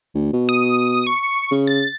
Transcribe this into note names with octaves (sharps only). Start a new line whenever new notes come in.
D2
B2
D#6
C#6
C#3
A6